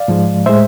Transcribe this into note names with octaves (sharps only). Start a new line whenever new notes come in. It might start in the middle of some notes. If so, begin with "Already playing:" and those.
Already playing: D5 F5
G#2 F3 G#3
A2 G#3 C5 E5